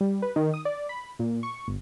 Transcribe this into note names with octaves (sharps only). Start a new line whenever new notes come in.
G3
B4
D#3
D#6
D5
B5
A#2
C#6
G1